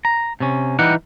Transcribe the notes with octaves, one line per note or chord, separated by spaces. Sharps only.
A#5
C3 C#4
E3 G3 D#4 F#5